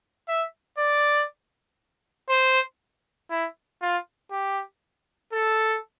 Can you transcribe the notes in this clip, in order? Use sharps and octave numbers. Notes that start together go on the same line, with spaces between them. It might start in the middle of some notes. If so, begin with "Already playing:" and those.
E5
D5
C5
E4
F4
G4
A4